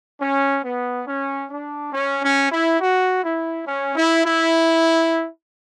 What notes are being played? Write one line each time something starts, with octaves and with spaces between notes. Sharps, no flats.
C#4
B3
C#4
D4
C#4
C#4
E4
F#4
E4
C#4
E4
E4